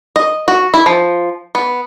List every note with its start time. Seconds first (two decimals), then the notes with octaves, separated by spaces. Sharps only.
0.16 D#5
0.48 F#4
0.74 E4
0.86 F3
1.55 B3